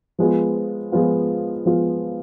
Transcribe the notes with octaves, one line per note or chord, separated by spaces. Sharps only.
F3 G#3 B3 F4
F3 G#3 B3 F4
F3 G#3 B3 F4